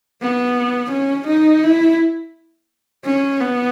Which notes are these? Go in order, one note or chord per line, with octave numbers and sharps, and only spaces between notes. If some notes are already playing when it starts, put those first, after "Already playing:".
B3
C#4
D#4
E4
C#4
B3